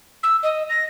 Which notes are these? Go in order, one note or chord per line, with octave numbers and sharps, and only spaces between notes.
E6
D#5
A#6